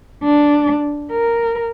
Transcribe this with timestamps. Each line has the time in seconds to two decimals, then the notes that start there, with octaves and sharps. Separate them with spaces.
0.24 D4
1.12 A#4